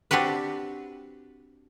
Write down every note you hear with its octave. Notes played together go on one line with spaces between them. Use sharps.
C4 D4 F#4 G4 B4